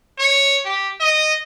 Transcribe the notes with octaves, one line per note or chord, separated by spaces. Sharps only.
C#5
G4
D#5